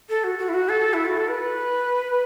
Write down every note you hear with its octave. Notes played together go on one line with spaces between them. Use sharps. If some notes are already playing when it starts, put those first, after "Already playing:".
A4
F#4
F#4
E4
F#4
A4
E4
F#4
A4
B4